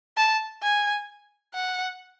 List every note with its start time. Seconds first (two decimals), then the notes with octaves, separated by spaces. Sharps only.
0.17 A5
0.62 G#5
1.54 F#5